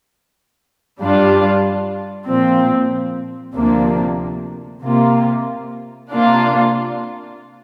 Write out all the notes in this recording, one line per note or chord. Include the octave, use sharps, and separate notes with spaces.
G2 G3 D4 F4
A#2 F3 C4
D2 C3 F3 A#3 D4
C3 A#3 F4
C3 A#3 D4 F4